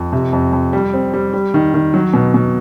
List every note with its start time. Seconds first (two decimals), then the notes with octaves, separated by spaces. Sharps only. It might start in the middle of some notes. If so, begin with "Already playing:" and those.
Already playing: F2
0.12 C3
0.33 F2
0.53 F2
0.73 G3
0.93 C4
1.14 G3
1.33 G3
1.54 D#3
1.74 D#3
1.94 F#3
2.14 B2
2.34 B2